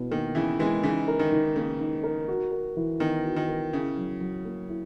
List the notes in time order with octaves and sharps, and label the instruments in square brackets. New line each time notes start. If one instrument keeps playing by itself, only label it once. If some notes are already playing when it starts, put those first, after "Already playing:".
Already playing: [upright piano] B2 E4 B4
[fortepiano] D#3 [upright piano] A#3
[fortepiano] C#3 E3 [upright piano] E4
[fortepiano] E3 G#3 [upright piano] B4
[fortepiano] C#3 E3 [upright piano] D#4
[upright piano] A#4
[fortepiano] D#3
[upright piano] D#3
[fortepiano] C#3 [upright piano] A#3
[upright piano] D#4
A#4
F#4
A#4
E3
[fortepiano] D#3 [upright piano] B3
[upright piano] F#4
[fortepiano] D#3
[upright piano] A#4
[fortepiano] C#3 [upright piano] E4
[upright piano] F#3
F#3
A#3
E4